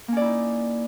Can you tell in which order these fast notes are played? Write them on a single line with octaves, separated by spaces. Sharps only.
A#3 C#4 D5 E4 D#4